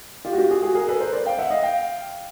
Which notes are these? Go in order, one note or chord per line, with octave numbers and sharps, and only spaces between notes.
F4 G4
F#4
F4 G4
F#4 G#4
F#4 G#4
G#4 A#4
A4 B4
A#4 C5
C5 D5
F5 G5
E5 F#5
D#5 F5
F5 G5